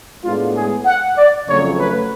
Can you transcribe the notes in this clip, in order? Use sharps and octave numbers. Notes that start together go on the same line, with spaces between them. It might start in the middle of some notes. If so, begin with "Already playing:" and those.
A2 G#3 B3 D4 F4
G#4
F#5
D5
F2 C#3 F#3 A3 C#5
B4